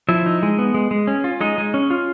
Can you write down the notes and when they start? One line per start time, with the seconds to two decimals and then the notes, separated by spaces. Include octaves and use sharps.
0.09 F3 E4 E5
0.26 D#4
0.43 G#3
0.59 B3
0.74 G#3
0.91 G#3
1.07 C#4
1.24 F4
1.41 G#3 D#4 D#5
1.58 G#3
1.74 C#4
1.90 F4